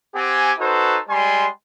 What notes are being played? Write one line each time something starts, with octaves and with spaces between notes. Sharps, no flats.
C4 G4 F#5 G#5
D#4 F#4 A4 B4 C5
G3 G#3 G#5 C6